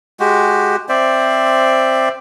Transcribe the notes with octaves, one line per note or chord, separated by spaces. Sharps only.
G#3 F#4 G4
C4 C5 D5 E5